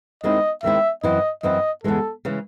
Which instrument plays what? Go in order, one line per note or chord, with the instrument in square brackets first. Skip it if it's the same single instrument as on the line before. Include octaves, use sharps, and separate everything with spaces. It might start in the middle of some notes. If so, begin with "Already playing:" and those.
[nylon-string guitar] D#2 D#3 G#3 C4 E4 [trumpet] D#5
[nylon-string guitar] D#2 D#3 G#3 C4 E4 [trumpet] E5
[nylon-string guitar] F#2 E3 C4 E4 [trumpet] D#5
[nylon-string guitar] F#2 E3 C4 E4 [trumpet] D#5
[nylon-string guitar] E2 C#3 E3 G#3 [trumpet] A4
[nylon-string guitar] C#3 E3 G#3